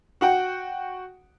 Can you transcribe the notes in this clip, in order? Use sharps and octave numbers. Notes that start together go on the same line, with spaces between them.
F#4 F#5 G5